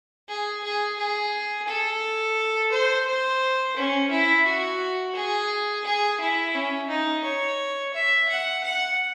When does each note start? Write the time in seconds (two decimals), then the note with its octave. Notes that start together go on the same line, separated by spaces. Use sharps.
0.28 G#4
0.63 G#4
0.98 G#4
1.67 A4
2.72 C5
3.07 C5
3.76 C#4
4.11 E4
4.46 F#4
5.15 G#4
5.84 G#4
6.20 E4
6.54 C#4
6.89 D#4
7.24 C#5
7.94 E5
8.29 F#5
8.63 F#5